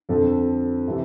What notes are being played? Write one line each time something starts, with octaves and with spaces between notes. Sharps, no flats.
F2 D3 F3 A4
C3 E3